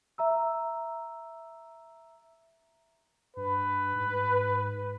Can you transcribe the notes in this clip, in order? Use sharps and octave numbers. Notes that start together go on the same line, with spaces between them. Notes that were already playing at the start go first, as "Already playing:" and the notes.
E5 A#5 E6
G2 B4
G#2